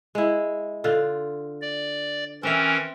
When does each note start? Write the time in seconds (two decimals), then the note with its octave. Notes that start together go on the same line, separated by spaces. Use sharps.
0.15 G#3 E4
0.84 D3 F4
1.62 D5
2.43 E3 C4 C#4 A#4 E5